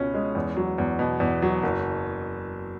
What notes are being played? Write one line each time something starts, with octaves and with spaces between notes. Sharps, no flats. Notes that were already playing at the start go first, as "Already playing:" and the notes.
Already playing: C#2 B2 C#4
G#3
E2
F#3
E2
B2
E2
F#3
F#1